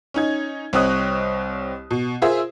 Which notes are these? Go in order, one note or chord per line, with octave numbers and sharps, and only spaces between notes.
C#4 D#4 G#6
C2 C4 C#5 D#5 D#6 F#6
B2
F4 G#4 A#4 C5 E5